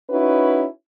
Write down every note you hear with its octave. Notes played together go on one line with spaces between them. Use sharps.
C#4 D#4 E4 F#4 B4